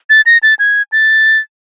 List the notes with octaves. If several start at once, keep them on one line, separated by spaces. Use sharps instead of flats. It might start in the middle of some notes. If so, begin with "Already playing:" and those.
A6
A#6
A6
G#6
A6